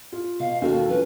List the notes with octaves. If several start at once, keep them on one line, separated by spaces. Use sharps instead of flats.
F4
B2 F5
D#2 F#4 A4 F5
F3 C#4 B4